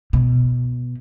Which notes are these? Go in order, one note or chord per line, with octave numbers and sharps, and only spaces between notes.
B2